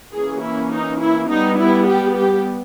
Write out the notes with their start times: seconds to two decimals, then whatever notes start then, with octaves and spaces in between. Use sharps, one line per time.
0.12 E3 A#3 C#4 G#4
0.41 E4
0.71 D#4
0.99 E4
1.28 G3 B3 D#4
1.58 E4
1.87 G4
2.15 G4